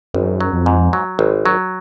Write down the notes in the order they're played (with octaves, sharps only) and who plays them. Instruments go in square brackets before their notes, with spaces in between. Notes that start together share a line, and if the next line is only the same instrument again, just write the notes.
[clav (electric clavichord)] G#1 [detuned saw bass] F#2
[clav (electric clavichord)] F#3
[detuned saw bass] F2
[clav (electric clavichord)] G#2
F#3
G#1
F#3